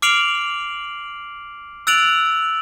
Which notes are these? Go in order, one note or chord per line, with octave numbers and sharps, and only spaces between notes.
D6 F6 C7 D7 F7 F#7
E6 F#6 A6 D7 F7 F#7